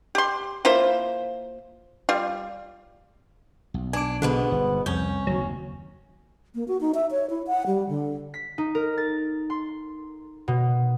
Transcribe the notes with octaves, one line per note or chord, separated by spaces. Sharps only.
G4 C6
A#3 E4 F4 C5
G3 F4
B1
D4 G#5 D6
G#2 B2 D3 B3
G1
C2 F2 C#4 G6
F#1 D#2 C3 F#3
A#3
F#4
D#4
E5
C#5
E4
F#5
G3
D3
B6
D#4
A#4
A6
C6
B2